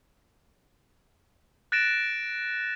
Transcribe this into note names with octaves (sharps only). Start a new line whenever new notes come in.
F#6 A6 A#6 D7 E7